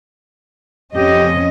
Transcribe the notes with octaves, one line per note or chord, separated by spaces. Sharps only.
F2 C#4 G4 D#5